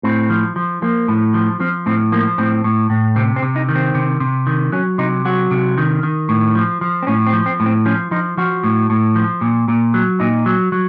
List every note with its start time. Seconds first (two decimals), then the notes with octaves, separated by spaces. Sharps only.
0.03 A2 C4
0.30 F3
0.56 F3
0.82 F3 A#3
1.08 A2
1.34 F3
1.60 F3 C4
1.86 A2 C4
2.12 F3 A#3
2.38 A2 C4
2.64 A2
2.90 A2
3.16 C3 C4
3.36 C4
3.42 C3
3.56 D#4
3.69 D#3
3.75 C4
3.95 C3
4.20 C3
4.47 D#3
4.72 F#3 C#4
4.98 C3 D#4
5.25 F#3 F#4
5.51 C3
5.78 D#3
6.03 D#3
6.29 A2
6.55 F3
6.81 F3
7.03 C4
7.07 A2 C#4
7.27 C4
7.33 F3
7.46 C4
7.60 A2
7.66 C4
7.85 F3 C#4
8.11 F3 D#4
8.37 F3 F#4
8.64 A2
8.90 A2
9.16 F3
9.41 A#2
9.68 A#2
9.94 F#3
10.20 A#2 D#4
10.46 F#3
10.72 F#3